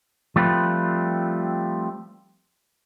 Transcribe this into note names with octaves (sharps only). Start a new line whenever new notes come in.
F3 G3 A3 C4 F4 B4